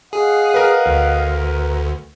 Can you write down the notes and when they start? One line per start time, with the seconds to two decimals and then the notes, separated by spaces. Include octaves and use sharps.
0.13 G#4 D#5 F5 F#5
0.54 A#4 B4
0.86 D2